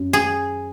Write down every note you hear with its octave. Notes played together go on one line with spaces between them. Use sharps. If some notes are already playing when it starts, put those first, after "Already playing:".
Already playing: F#2
G#4